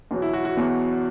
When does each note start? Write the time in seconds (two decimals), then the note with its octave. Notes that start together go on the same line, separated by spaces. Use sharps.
0.11 E2 B2 F#3
0.22 E4
0.33 F#4
0.45 F#4
0.57 E2 B2 F#3